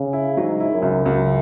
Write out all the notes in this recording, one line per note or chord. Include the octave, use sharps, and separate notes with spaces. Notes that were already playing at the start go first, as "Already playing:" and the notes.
Already playing: C#3
E4
G#2 F#3
E4
F#2
C#2
C#2 F#2